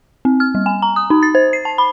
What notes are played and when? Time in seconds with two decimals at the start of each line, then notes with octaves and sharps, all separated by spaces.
0.25 C4
0.40 F6
0.55 G3
0.66 G#5
0.82 A#5
0.96 D#6
1.10 D#4
1.23 A6
1.35 C5
1.53 C7
1.65 A5
1.78 B5